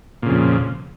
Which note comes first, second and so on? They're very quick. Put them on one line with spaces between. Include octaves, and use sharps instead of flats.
A#2 C#3 F2